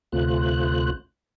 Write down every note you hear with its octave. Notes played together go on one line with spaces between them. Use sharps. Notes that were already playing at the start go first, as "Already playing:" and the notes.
D2 C3 A3 F4 C5 F#6